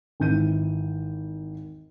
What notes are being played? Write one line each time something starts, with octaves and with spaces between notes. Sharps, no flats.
G#1 E3 G6 D#7